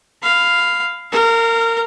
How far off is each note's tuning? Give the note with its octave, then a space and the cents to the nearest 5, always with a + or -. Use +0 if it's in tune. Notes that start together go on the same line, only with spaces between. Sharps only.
F5 +0 B5 +25
A#4 -25 F5 +0